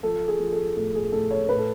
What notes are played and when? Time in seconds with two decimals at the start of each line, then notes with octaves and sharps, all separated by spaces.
0.03 F3 A4
0.28 G#4
0.40 F3
0.52 A4
0.76 A2 A4
0.95 G#4
1.12 A2 A4
1.31 C#5
1.49 A2 B4
1.58 A4